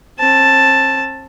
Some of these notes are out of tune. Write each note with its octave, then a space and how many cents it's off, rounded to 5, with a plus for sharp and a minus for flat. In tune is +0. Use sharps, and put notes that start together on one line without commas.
C4 +40 A5 +0